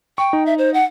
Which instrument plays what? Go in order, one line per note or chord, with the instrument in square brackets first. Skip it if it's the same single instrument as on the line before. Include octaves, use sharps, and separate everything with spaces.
[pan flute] G5 [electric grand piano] C#6
[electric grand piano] D#4
[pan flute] E5
C5
F#5